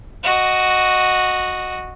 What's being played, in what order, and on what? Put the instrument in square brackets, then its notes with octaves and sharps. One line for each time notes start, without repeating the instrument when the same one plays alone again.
[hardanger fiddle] F#4 D#5